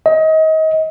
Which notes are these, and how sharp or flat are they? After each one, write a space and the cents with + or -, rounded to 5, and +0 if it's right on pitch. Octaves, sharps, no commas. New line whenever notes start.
D#5 +30